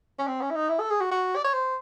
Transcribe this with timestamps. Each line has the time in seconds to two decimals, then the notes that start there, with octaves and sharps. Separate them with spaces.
0.19 C#4
0.27 C4
0.41 C#4
0.51 E4
0.55 D#4
0.69 E4
0.80 A4
0.90 G#4
1.01 F#4
1.11 F#4
1.36 D5
1.44 C#5
1.53 C5